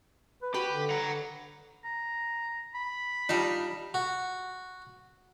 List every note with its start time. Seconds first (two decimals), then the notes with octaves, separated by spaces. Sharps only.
0.42 B4
0.54 F#4 G4 B4
0.69 D3
0.90 F#5 A#5
1.07 D3
1.84 A#5
2.74 B5
3.29 G3 D4 D#4 F4
3.94 F#4